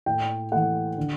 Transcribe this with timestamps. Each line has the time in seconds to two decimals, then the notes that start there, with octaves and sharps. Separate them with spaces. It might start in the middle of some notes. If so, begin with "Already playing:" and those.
0.06 A2 G5
0.52 E3 A3 F#5
0.97 D3